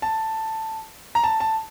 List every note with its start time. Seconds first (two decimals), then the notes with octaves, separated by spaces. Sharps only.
0.02 A5
1.15 A#5
1.24 A5
1.40 A5